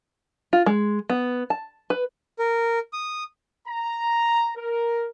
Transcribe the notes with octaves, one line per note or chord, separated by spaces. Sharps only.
F4
G#3
B3
A5
B4
A#4
D#6
A#5
A#4